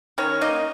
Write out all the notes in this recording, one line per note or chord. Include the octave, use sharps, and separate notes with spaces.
D#3 C#4 C#5
A#3 D#4 D#5